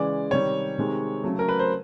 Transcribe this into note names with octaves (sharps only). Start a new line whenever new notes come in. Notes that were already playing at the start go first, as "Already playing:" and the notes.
Already playing: C#3 E3 G#3 D5
C3 D#3 G3 C#5
C3 D#3 G#3
C#3 F#3 A3
A#4
B4
C5